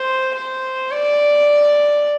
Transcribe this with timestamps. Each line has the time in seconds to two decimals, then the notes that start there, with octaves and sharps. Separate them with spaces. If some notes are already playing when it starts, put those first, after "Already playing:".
Already playing: C5
0.35 C5
0.91 D5